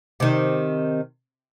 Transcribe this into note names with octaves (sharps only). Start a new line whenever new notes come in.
C3 D#3